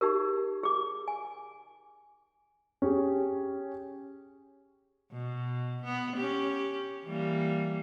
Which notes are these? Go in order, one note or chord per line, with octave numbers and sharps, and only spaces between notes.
D#4 G4 G#4 A#4
G#4 D6
G#5
C#4 G4 G#4
B2
B3
C#4 G4
E3 G3 A#3